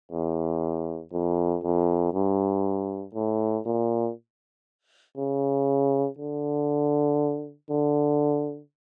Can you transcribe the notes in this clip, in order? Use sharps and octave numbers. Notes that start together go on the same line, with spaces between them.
E2
F2
F2
G2
A2
A#2
C#3
D3
D3